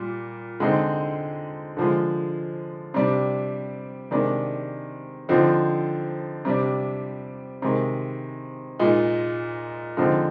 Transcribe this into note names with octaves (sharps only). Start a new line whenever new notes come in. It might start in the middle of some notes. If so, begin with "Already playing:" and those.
Already playing: A#2 G3
D3 G#3 C4 D#4
D3 F3 G#3
C3 G3 D4
C3 D#3 G#3 D4
D3 F3 C4 D#4
C3 G3 D4
C3 D#3 G#3
A#2 G#3 D#4
D3 F3 G#3 C4 D#4